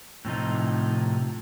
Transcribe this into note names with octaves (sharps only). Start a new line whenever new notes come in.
A2 C3 F3 D#4